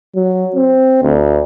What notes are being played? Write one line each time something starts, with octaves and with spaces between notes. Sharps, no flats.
F#3
C4
D2